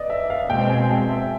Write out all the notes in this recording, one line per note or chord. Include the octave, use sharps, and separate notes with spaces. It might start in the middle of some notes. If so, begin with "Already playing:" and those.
Already playing: B4 D5 D#5
E5
F5
B2 G#3 C4 G5
G#5
A5
E5